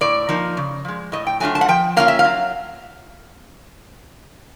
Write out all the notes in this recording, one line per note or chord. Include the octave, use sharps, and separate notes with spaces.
A2 D5
F3 A#3 D#4
C#3
F3 G#3
A2 D#5
G5
F#3 A3 D4 F4 G#5
A5
F#5
F3 G5
A#3 C#4 F4 F5
E5
F5
F#3